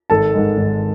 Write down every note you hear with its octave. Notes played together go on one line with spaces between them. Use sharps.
G#1 A4 A5
G#2 D#3 G#3
G#1